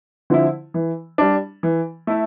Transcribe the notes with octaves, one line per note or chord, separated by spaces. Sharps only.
D3 F3 C4 E4
E3
G3 D4
E3
A3 E4